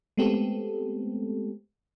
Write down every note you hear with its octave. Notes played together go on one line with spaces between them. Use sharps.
G#3 A3 B3 C4 G4 A4